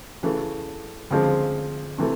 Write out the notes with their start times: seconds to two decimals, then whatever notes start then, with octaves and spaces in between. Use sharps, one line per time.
0.23 C#3 E3 A3
1.11 D2 C#3 F3 G#3 C4
1.98 C3 E3 A3